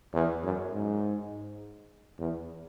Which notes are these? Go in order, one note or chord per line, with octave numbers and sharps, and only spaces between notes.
E2
F#2
G#2
E2